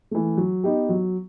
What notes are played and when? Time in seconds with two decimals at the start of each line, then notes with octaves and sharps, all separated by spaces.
0.11 E3 A3
0.37 F#3
0.64 B3 D#4 G4
0.89 F#3